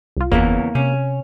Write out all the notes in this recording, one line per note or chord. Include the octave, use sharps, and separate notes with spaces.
C2 F4
F#1 E2 C#3 E3 A#3 B3
C3 C#4